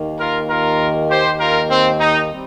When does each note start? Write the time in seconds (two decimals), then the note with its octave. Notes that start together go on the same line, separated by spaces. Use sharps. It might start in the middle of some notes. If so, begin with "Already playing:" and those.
Already playing: D#2 D#3 A#3
0.19 F4 A#4
0.49 F4 A#4
1.09 G4 C5
1.39 F4 A#4
1.69 C4
1.99 D#4
2.31 G3 C4